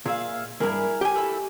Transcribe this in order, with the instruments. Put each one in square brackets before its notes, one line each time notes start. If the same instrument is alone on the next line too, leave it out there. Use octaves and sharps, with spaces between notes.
[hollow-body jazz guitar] A#2 [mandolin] G#4 E5 F5
[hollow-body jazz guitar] C#2 G2 [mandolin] E4 G#4 A#4
[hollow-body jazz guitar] G4 G#5
[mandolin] A3 E4